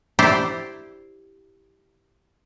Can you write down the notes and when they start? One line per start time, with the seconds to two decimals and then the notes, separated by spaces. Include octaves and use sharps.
0.19 E4 G4 C5 D5